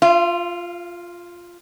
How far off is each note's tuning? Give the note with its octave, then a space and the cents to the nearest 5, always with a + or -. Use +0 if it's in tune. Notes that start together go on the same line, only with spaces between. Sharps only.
F4 +0 F5 -45